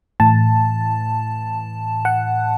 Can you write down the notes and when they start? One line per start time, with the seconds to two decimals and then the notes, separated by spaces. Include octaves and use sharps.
0.20 A2 E3 A5
2.05 F#5